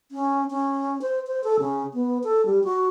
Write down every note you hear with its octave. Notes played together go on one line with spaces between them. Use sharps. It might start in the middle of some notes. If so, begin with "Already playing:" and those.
C#4
C#4
C5
C5
A4
C#3
B3
A4
G3
F#4